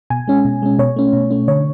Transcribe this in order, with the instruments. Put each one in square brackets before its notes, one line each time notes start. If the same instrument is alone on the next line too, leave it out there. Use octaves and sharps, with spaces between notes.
[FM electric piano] B2 G#5
G#3 C#4
B2
G#3 C#4
B2 C#5
A3 C#4
B2
A3 C#4
D3 C#5